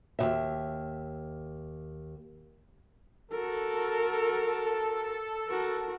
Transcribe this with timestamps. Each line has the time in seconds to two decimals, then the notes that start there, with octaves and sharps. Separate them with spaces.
0.19 D#2 C3 E5
3.32 F#4 A4 A#4
5.48 F#4 A#4